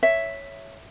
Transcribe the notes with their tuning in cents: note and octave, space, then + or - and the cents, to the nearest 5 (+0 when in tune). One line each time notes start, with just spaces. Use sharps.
C#5 +0 E5 +0